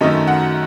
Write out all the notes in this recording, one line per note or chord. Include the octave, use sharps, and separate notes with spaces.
F#2 D#3 A3 C#4 D#5
F#5